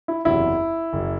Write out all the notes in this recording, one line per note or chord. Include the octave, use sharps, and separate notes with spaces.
E4
F#1 E2 C3 F#3 E4
F#1 F#3